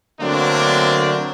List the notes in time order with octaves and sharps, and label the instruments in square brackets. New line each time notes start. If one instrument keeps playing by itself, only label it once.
[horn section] D3 F#3 A3 A#3 C4 D4